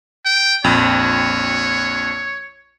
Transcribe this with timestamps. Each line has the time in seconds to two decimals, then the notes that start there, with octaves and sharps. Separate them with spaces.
0.25 G5
0.64 A#1 F2 C#5